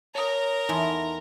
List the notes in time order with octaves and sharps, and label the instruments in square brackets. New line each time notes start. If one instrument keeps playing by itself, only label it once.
[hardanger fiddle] A#4 A#5 [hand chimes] C#5 D#6
[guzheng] E2 A3 E4 [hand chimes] D#4 [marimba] G#5 A5 C6